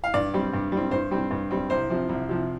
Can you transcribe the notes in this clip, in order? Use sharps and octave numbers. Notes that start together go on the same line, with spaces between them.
F5
G2 D5
G3 C4
G2
G3 C4
G2 C5
G3 C4
G2
G3 C4
C2 C5
C3 F3
C2
C3 F3